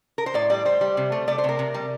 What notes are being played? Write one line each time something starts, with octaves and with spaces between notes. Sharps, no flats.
A#4
C5
A2 D5
G3 D5
G3 C5
G3
C3
A3
A3 D5
C5
C3 A#4
C3
G3